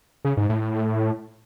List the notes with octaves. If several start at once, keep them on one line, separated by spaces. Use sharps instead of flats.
C#3
G#2
A2